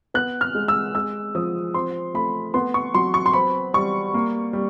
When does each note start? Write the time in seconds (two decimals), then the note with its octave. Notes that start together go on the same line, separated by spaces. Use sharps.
0.14 B3 F#6
0.41 F6
0.55 G#3
0.68 E6
0.95 G#3 E6
1.35 F3 D#6
1.74 C4 C6
2.14 A3 B5
2.54 B3 C6
2.74 C#6
2.94 F#3 C6
3.14 C#6
3.26 C6
3.33 C4 B5
3.74 G3 C#6
4.14 A#3
4.53 G3